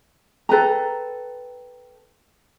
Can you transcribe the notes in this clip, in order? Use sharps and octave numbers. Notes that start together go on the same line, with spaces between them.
A4 B4 G5 A#5